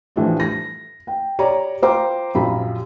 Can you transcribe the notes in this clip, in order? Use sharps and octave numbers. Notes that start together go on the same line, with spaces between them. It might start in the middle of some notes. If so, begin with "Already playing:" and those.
A2 E3 F3 G3 A3 D4
A#6
G5
G4 C#5 D5 A#5
F4 C5 G5 A#5 D6
A#1 F#2 F4 G4 A#5 B5